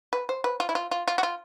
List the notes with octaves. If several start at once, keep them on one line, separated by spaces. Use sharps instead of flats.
B4
C5
B4
F4
E4
F4
F4
F4
F#4
F4